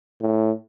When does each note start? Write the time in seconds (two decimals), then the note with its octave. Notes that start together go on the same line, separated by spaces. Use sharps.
0.21 A2